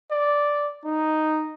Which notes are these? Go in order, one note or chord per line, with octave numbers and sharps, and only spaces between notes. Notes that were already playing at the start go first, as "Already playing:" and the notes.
D5
D#4